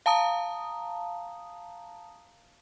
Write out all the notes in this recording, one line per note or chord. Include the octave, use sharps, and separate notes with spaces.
F5 A5 A#5 D#6